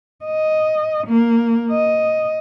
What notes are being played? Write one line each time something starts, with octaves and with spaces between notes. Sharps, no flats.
D#5
A#3
D#5